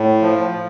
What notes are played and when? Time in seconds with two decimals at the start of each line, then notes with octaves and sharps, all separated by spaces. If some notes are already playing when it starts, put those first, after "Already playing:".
Already playing: A2
0.22 F3
0.53 F3